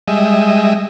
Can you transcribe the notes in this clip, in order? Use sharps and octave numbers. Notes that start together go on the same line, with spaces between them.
G3 G#3 D#5 E5